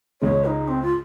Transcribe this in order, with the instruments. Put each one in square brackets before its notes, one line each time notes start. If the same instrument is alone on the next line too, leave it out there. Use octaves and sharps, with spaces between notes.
[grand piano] C#2 C#3 G#3 [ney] C#5
[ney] D#4
C4
F4